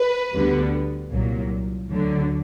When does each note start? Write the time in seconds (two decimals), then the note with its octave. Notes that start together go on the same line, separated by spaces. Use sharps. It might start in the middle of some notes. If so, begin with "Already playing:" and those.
Already playing: B4
0.33 D2 D3 G3 B3
1.11 C2 A#2 F#3
1.89 D2 D3 F#3